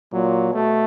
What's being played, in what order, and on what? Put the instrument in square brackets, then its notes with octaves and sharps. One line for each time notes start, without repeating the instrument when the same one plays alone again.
[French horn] A#2 [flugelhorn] F#3
[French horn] B2 [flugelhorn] A3